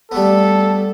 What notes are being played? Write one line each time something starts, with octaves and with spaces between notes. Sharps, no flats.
G3 A3 B3 A4